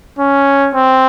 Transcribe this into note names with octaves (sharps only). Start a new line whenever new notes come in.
C#4
C4